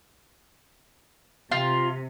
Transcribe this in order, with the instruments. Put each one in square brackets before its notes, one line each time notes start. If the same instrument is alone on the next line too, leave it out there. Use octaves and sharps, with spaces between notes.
[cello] C3 [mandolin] F4